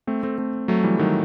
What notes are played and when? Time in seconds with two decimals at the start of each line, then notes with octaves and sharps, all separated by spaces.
0.07 A3 C4
0.23 A3 C4
0.38 A3 C4
0.68 F#3 A3
0.84 E3 G3
0.99 D#3 F#3